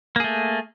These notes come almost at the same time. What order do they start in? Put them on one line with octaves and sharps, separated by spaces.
A#3 G#4 A3